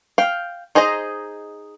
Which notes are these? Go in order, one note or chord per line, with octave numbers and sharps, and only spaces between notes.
F5 G5
D#4 G#4 C5 D#5 A#5